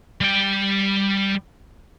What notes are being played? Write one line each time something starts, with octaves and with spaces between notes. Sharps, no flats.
G3 G5